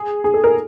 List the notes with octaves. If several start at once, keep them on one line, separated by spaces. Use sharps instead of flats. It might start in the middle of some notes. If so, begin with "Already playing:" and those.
Already playing: G#4
G#4
A4
A#4